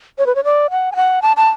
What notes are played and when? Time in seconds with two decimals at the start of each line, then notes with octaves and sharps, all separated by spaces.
0.18 C#5
0.26 B4
0.35 C#5
0.44 D5
0.71 F#5
0.92 G#5
0.96 F#5
1.22 A5
1.37 A5